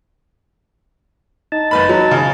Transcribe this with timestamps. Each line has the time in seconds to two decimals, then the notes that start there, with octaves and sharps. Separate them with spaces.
1.52 D#4 A5
1.71 F#1 B4 B5
1.89 F#3
2.11 C#3